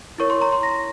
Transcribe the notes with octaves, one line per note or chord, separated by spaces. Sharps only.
E4 A#4 C#5 C#6
C6
A#5
C6
A#6